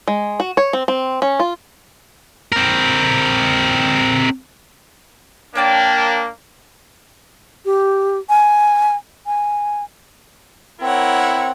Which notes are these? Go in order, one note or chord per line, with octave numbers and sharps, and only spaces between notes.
G#3
F#4
C#5
C4
C4
C#4
F4
C4 A#4
A#3 D4 C#5 G5 A5
G4
G#5
G#5
C4 E4 A#4 C#5 F#5